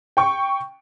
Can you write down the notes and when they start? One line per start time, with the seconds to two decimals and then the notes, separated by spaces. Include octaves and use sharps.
0.17 G5 C#6